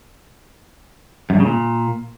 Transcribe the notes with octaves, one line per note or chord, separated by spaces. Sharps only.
F#2
G2
C#3
A#2